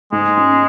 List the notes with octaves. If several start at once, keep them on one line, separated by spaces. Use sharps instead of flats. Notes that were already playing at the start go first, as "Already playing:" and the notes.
G#2 G#3
C#4